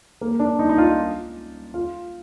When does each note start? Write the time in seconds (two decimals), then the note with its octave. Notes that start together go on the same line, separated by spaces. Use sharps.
0.21 A#3
0.39 D4
0.59 D#4
0.69 D#4
0.78 F4
1.74 F4